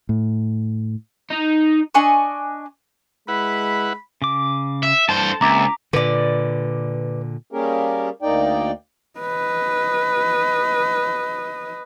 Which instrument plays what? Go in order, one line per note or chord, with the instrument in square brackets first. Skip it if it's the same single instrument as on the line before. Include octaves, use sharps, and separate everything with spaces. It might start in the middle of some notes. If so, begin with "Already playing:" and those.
[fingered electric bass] A2
[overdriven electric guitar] D#4
[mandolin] D4 D#5 G#5 C#6
[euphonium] G#3 [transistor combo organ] E4 B4 F#5 [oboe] B5
[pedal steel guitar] C#3 D6
[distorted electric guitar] E5
[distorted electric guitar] G2 C5 [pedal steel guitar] A4 A5
[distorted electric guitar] C#2 [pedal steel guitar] A#3 C4 E5 [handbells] A#5 D6 B6
[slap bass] A#2 D3 [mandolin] B4 D5
[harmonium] G3 A#3 C#4 G4 G#4 A#4
D2 A#3 D#4 D5 G5
[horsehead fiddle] B4 D#5